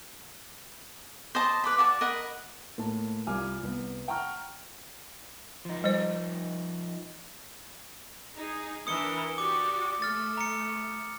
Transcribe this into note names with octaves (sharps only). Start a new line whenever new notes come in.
C5 D#5 A5
B4 D5 B5
F#4 D5 A5
A#4 D#5 F#5 B5
A2 A#3 A5
C2 G3 F4 G#5 D6 F6
C2 B3
F#5 G5 A5 A#5 C#6 F6
F3 D#4
G3 C5
D#4 G#4
E3 D4 A#4 D#6 C#7 G7
F#4 G4 D5 D6
A3 F6 A6
A#5 C#7